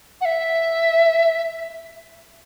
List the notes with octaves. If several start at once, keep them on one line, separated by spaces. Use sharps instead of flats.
F#5
E5